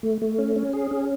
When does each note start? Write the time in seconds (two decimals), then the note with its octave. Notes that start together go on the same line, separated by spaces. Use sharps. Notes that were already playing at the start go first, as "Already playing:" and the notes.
0.03 A3
0.22 A3
0.39 C#4
0.56 C#4
0.73 G#4
0.91 C#4